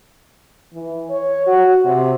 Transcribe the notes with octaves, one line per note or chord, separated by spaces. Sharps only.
E3
C#5
F#4
C3